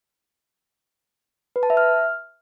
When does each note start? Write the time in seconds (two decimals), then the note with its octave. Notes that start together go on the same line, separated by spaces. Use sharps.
1.56 B4
1.63 A5
1.70 E5
1.77 F6